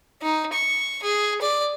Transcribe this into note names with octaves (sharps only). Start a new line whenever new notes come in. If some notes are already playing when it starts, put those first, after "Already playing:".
D#4
C#6
G#4
D5